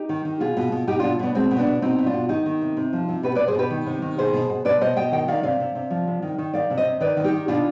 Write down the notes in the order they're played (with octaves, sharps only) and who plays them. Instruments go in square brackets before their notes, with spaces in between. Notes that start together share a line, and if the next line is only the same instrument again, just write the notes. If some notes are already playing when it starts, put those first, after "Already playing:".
Already playing: [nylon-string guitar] D#4 G4
D#3
D#3
B2 F4 G#4
B2
B2
B2 D#4 G4
B2 D4 F4
B2 B3 D4
B2 G#3 C4
B2
B3 D4
B2
B2 C4 D#4
B2
D4 F4
B2
D#3 D#4 G4
D#3
C3
C3
F3
C3
B2 G4 B4
B2 B4 D5
G#4 C5
B2 G4 B4
D#3
C3
D#3
B2 G#4 C5
B2
B2
B2 B4 D5
B2 C5 D#5
B2 D#5 G5
D#3 D#5 G5
D#3 D5 F5
C3 D5 F5
C3
C3
F3
C3
D#3
D#3
D#3 D5 F5
C3
C5 D#5
C3
D#3 B4 D5
D#3
D#4 G4
D#3
B2 D4 F4